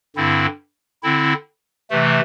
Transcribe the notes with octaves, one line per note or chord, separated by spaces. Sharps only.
G2 D3 C4 E4
D3 C4 E4
C3 E3 A3